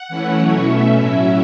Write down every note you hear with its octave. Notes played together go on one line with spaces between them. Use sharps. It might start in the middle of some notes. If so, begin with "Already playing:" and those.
Already playing: F#5
E3 A3 C#4 E4
B2 F#3 A3 C#4 E4 C#5
B2 A3 C#4 E5
A2 F#3 C#4 E4